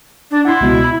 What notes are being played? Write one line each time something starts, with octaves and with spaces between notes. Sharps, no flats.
D4
E4 F#5 C6
C#2 B2
B5